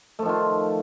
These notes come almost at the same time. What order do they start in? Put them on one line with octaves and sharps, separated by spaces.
A3 F3 D#3 F4